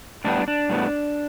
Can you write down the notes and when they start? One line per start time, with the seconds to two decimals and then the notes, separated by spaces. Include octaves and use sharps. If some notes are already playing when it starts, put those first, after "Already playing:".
0.24 A2 G3 B3 D4
0.48 D4
0.70 A2 G3 B3